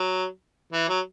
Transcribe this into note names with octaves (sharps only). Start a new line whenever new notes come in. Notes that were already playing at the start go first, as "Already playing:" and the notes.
Already playing: F#3
E3
F#3